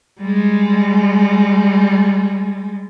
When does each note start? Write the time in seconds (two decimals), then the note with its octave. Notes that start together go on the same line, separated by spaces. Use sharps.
0.20 G3 G#3